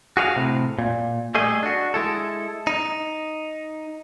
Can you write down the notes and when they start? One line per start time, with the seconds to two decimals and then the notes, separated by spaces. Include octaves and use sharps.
0.17 F#4 G#4 C#5 F5
0.36 A2 C3
0.79 A#2
1.35 G3 A3 G#4 D#5
1.63 D4 F#4
1.94 G#3 E4 A4
2.67 D#4